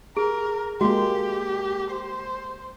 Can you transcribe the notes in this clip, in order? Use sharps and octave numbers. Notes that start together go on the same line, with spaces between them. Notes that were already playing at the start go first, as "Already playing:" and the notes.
G#4 A#4
G#3 A#3 F#4 G4
C5